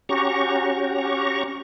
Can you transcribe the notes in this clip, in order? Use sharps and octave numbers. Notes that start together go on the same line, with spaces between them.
C#4 F#4 G4 A#5 C#6